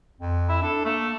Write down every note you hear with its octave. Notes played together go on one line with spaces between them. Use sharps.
F2
E4
D4 A4
A3 A#3